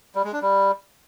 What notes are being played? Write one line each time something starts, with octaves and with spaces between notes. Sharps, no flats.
G3
G#3
D4
G3